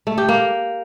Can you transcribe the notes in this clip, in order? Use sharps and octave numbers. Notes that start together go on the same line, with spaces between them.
A3
G4
A#3